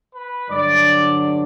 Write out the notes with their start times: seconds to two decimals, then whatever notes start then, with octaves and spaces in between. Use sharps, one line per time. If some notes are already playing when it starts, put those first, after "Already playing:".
0.13 B4
0.49 G2 D3 F#3 D5